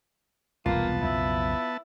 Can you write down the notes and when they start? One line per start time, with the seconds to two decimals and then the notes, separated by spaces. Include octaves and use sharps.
0.66 E1 C2 A#3 B3 F4 A5
1.02 B1 F2 C#3 E4